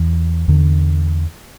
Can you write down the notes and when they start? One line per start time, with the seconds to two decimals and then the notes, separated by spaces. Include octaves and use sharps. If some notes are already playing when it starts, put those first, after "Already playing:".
Already playing: E2
0.48 E2 D3